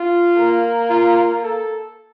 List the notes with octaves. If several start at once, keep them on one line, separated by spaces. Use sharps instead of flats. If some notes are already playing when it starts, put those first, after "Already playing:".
Already playing: F4
A#3
F4
A4